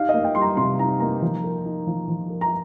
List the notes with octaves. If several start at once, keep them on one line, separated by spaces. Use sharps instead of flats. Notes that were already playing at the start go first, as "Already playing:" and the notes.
Already playing: D#4 G4 F5
D#5
A#3
G5
G3 C6
A#5
C3 C6
D#4 A#5
A#3 A#5
F3
A#4
D#4
F3
F3
A#4
A#5